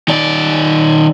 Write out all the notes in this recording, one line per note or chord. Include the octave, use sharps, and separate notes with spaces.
D#3 D5